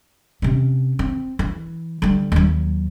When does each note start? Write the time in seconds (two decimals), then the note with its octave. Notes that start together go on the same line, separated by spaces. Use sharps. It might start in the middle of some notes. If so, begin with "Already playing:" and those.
0.42 C3 C#4
0.99 C4
1.39 E3
2.02 D3 G3
2.32 D#2 F#3